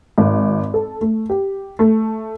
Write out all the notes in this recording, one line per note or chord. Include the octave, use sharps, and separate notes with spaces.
G#1
A4
A3
G4
A3